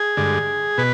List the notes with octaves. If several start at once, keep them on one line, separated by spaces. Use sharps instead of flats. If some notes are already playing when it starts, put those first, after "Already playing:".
Already playing: G#4
G2 D3 G#3
B2 B4